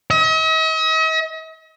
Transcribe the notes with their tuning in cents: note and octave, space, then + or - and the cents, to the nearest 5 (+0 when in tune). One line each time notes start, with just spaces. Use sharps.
D#5 +45